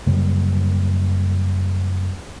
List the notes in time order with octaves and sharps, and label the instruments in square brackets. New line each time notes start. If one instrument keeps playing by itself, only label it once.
[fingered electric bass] F#2 C#3 G3 A#3